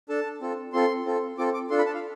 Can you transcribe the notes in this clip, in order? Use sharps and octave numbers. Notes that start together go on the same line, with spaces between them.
D4 A4 A5
C4 F4 A4
C4 F4 A4 C6
C4 F4 A4
C4 F4 A4 D6
D6
D4 F4 A4 C6
B5
A5
F5